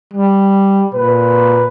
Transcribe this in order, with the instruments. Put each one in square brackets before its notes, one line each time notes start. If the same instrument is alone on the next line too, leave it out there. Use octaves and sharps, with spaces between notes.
[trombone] G3
[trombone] A#2 [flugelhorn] B4